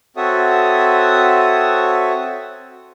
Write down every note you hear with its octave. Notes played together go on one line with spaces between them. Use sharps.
C4 F#4 A4 C#5 E5 D#6